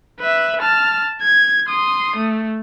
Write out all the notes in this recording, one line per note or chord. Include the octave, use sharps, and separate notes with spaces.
B4 E5
A5 F6
G#6
C6 D#6
A3